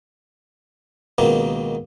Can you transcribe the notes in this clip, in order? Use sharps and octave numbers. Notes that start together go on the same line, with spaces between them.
C#2 B2 D#3 A#3